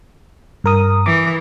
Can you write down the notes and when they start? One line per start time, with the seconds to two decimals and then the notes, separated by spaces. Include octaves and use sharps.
0.64 G2 A#4 D#6
1.06 E3 D6